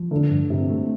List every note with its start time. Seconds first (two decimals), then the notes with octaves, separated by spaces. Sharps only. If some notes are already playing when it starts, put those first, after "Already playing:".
Already playing: F3
0.11 D3 A3 D4
0.31 G2
0.50 G2 C3
0.70 A3